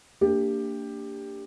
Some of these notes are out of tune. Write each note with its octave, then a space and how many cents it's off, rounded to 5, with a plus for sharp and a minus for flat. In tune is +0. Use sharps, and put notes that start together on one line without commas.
A#3 -35 D4 -15 G4 +10